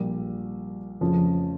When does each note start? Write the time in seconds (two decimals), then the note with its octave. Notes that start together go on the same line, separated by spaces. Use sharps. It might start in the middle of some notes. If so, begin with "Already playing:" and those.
Already playing: A#1 A#2 G3
1.01 F1 F2 C#3 F3